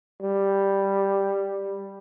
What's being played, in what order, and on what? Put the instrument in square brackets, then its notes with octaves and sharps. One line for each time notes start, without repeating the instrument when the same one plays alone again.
[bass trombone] G3